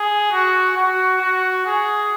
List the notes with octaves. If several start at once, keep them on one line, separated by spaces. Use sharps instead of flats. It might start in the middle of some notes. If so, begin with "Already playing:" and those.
Already playing: G#4
F#4
F#4
F#4
G#4